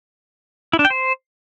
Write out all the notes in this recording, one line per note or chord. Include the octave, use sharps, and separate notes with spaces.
E4
D4
G5
C5